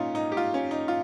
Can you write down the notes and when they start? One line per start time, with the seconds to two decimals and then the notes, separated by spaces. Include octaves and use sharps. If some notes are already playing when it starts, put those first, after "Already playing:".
Already playing: A#2 C#4 D#4 F4
0.15 D#4
0.32 G4
0.37 F4
0.54 C#4
0.71 D#4
0.88 F4